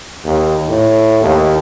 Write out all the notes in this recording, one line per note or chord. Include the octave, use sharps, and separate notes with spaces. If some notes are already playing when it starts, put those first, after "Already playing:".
D#2
A2
D#2